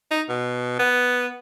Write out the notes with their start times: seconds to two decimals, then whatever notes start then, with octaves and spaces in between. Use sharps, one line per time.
0.11 D#4
0.29 B2
0.79 B3